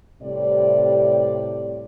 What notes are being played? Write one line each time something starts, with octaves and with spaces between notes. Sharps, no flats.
A2 C3 G3 C4 D5